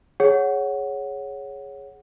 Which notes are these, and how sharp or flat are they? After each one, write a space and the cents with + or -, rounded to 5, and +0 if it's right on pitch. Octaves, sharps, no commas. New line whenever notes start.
G#4 +0 C#5 +0 F#5 +0